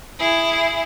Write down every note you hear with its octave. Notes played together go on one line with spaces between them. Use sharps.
E4 G#4